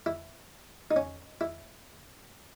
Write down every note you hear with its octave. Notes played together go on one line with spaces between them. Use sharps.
E4
D#4
C#4
E4